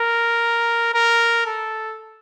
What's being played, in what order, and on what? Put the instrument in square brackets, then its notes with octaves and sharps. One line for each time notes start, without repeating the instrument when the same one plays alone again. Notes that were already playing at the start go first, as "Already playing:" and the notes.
Already playing: [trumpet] A#4
A#4
A4